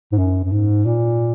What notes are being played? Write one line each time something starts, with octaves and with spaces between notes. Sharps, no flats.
G#2
F#2
F#2
G#2
A#2